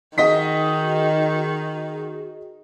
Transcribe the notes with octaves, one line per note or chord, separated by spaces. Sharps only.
D#3 D#4 F#4 G#4 D#5 D#6 B6